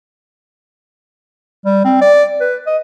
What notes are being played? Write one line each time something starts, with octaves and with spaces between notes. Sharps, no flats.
G3
C4
D5
B4
D#5